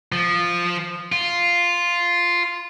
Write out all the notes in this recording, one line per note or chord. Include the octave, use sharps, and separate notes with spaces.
F3
F4